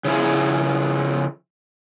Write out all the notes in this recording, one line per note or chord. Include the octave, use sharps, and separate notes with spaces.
C#3 F3 E4 G#4